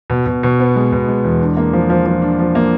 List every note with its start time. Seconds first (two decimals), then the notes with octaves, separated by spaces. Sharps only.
0.10 B2
0.26 B2
0.43 B2
0.60 B3
0.76 G#3
0.92 B2
1.08 G#3
1.24 E2
1.41 D4
1.57 A#3
1.73 F3
1.90 F3
2.06 F3
2.22 D4
2.39 F3
2.55 A#3